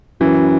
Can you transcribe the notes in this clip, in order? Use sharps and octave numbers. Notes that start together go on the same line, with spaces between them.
F#2 E3